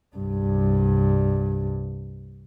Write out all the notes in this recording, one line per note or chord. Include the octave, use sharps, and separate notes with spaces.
C2 G2